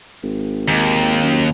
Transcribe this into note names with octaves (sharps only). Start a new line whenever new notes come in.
G#1
D#2
F#2